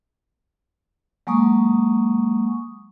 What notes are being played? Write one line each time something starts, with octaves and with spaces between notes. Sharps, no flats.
F#3 G#3 A#3 C#6 D#6